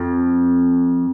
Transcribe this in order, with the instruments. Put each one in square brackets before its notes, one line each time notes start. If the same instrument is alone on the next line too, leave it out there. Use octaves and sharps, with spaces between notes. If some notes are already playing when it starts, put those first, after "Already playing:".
Already playing: [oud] F2